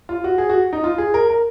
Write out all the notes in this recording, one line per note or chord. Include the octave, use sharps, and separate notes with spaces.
F4
F#4
G#4
F#4
D#4
F4
G#4
A#4
A#4